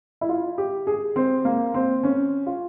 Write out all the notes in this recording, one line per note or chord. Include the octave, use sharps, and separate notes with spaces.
E4
F4
G4
G#4
C4
A#3
C4
C#4
F4